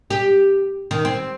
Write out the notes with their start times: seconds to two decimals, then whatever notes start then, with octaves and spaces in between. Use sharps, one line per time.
0.10 G4
0.91 D#3
1.05 C4